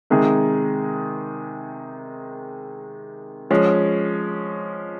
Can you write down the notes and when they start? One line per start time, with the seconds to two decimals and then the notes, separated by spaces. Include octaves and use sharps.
0.10 C3 D#3 G#3 D#4 G#4
3.51 F3 G#3 C#4